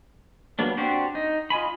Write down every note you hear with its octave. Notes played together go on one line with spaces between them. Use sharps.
F#3 G3 A#3 B3 D4
C4 D4 F#4 G4 C5
D#4
F4 D#5 G#5 B5